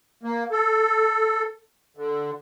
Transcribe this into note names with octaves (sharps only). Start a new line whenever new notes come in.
A#3
A4
D3